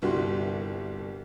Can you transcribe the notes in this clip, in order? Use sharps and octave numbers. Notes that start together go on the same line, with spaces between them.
G1 C2 F#4 G4 C6